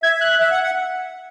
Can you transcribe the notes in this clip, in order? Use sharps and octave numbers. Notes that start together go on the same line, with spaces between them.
E5 G#6
F#6
E5
F#5
F#5